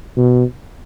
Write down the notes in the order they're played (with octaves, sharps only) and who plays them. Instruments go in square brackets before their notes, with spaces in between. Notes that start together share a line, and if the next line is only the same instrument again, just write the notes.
[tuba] B2